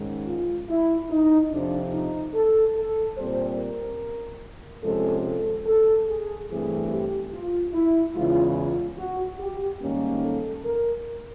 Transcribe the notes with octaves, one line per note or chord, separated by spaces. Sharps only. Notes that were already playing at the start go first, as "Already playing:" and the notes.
Already playing: G#2 D#3 G#3 C#4
F4
E4
D#4
F2 C3 F3 D4
D#4
A4
A4
A#2 G3 C4 C5
A#4
C3 F3 G#3 C#4 A4
A4
A4
G#4
G2 E3 A3 C4 G#4
G4
F4
E4
E2 C#3 E3 G#3 F4
F4
F#4
G4
G#2 D#3 G3 A#3 C#4
A4
A#4